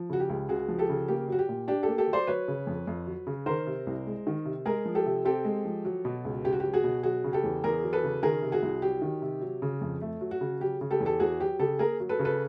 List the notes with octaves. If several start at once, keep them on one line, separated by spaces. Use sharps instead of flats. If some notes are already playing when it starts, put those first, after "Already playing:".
Already playing: F3
C#3 F#4
G4
C#2
C#2 F#4 G#4
F3
G4 A4
C#3
A#3 G4
F#3 F#4
G4
A#2
D4 G4
A#3 G4 A4
G4 A4
F#3
C5 D5
F#3 B4 C#5
C#3
F2
F2
F#3
C#3
D#3 A#4 C5
C3
C2
G#3
D#3
C3
G#3 G#4 A#4
F3
G4 A4
C3
C4 G4 A4
G#3
F3
F#3
B2
C#2
C#2 G4
F#4
F#3 G4
F#4 G#4
B2
F#3 F#4 G#4
C#3
G4 A4
E2
E2 G#4 A#4
F#3
A4 B4
C#3
D#3 G#4 A#4
C3
F#4 G#4
C2
F#3 G4
D#3
C3
F#3
C#3
F2
A3
F#3
F#4
C#3
F#3 G4
C#3
G4 A4
E2
G4 A4
E2 F#4 G#4
F#3 G4
C#3 G4 A4
A#3 G#4 A#4
F#3
A4 B4
C#3
A4 B4